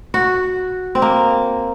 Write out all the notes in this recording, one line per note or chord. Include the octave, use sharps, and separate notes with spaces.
F#4
C4
A#3